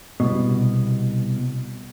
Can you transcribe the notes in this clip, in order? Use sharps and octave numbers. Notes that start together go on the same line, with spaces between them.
C2 G2 B2